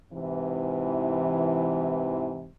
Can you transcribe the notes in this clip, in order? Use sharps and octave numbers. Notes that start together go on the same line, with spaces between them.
G#2 C3 E3